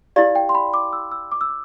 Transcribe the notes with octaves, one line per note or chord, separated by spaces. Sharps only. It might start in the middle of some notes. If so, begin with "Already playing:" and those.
E4 G4 D5 F5
G5
C6
B5
D6
E6
E6
D6
E6
D6